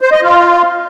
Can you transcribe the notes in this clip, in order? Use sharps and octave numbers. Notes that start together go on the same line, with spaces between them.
C5
D#5
F4